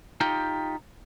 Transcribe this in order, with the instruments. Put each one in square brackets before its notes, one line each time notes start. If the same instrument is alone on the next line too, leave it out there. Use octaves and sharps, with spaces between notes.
[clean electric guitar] D#4 F4 G4 G5